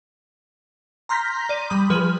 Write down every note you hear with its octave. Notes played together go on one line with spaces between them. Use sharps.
A#5 C6 F6 G6 A#6 B6
D5 D#7
G3 B5 D#6
F3 G#4 B4 F6